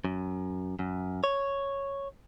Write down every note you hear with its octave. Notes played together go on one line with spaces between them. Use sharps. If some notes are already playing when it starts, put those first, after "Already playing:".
F#2
F#2
C#5